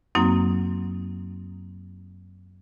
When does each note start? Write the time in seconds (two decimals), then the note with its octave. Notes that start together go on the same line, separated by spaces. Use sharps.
0.15 F#2 F#3 A#3 C4 D#4